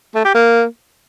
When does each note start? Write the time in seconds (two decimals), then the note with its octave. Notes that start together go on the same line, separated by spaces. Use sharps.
0.15 A3
0.25 G4
0.34 A#3